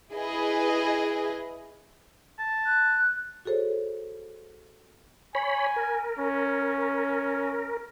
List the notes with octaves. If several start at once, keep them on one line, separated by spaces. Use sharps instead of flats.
E4 G#4 B4 D#5
A5
F#6
F#4 G#4 A4 C5 C#5
C#5 G#5 B5
A#4
C#4